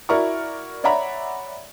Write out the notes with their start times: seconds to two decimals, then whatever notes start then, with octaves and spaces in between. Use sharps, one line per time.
0.09 E4 F#4 A#4 D5 A#5 C#6
0.84 C#5 D5 E5 F#5 A#5 B5